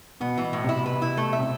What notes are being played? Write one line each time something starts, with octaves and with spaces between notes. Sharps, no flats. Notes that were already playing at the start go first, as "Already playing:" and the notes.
B2 B3
B2 E3
A2
C3 E4
B4
E4
A3
E5
C3